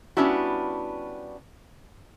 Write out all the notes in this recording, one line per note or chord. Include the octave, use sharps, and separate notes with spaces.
G3 B3 C#4 D4 E4 F#4